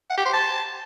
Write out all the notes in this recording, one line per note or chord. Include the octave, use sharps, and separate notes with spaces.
F#5
G4
C5
A5